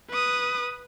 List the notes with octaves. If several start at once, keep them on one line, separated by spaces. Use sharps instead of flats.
B4 D#6